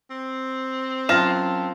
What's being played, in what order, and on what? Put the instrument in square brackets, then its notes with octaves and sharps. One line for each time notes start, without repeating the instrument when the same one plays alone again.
[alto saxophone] C4
[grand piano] F#2 A#6 E7 [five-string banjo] F4 [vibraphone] F5 G5 A5